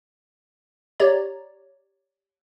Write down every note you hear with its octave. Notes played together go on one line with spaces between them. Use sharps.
G4 C#5 D5 A#5